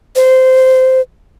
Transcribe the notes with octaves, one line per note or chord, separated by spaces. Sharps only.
C5